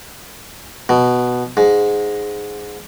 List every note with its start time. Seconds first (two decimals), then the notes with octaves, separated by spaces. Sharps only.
0.89 B2
1.57 G#2